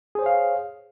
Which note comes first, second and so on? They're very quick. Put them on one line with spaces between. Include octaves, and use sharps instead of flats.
G#4 C5 C#5 F5